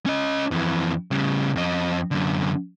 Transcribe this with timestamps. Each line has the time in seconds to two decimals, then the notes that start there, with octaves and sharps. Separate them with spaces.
0.06 C#4 D#5
0.51 F2 E3
1.11 C#3 G3
1.56 F2 D#5
2.11 F#2 D3